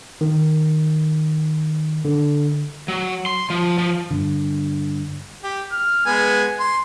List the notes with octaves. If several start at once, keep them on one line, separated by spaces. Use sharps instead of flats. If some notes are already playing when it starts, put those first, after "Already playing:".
D#3
D3
F#3
C6
F3
F3
G2 D3
G4
F6
G#3 B3 G#5
C6